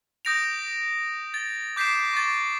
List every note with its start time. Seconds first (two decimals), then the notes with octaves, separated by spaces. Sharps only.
0.25 D#6 G6 A#6 D7 F7
1.34 A6
1.76 D6 G6 B6 C7 D7 E7
2.13 C#6 D6 A6